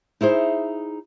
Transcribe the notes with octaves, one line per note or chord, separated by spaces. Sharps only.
D#4 E4 G#4 C5